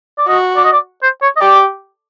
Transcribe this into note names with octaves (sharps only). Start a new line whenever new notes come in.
D5
F#4 D#5
D5
D#5
D5
C5
C#5
D#5
G4 D5